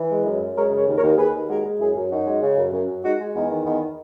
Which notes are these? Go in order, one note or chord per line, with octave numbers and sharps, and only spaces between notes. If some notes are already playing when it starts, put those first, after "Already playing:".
Already playing: E3
G#3
F#2
F#2
G#3 A#4 C#5
C#3
A#4 C#5
D#2
A#4 C#5
D#2
D#2 G#4 B4
D#2
G#3 F#4 A#4
G#3
F#2 E4 G#4
F#2
F#2 D#4 F#4
G#3
C#3
F#2
F#2
F#2
G#3 D#4 F#4
G#3
E2 B3 D#4
D#3
E2 B3 D#4